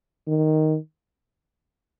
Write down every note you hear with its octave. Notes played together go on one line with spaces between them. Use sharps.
D#3